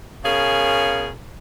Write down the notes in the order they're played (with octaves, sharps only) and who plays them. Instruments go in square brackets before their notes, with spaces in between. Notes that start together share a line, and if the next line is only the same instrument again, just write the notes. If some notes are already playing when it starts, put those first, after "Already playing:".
[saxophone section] B2 C#4 G#4 A#4 F5